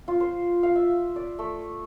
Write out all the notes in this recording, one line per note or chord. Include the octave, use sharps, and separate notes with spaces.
F4
C5
F5
E5
D5
A3